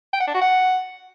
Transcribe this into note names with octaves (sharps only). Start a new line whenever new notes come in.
G5
F#5
D4
F#4
F#5